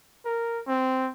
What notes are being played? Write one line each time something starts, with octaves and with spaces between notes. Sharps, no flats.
A#4
C4